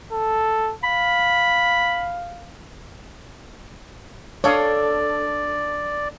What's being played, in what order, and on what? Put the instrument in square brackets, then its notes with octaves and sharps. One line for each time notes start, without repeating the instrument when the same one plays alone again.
[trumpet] A4
[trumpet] F5 [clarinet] B5
[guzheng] D4 A4 [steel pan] C#5 F5 D#6 [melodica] D5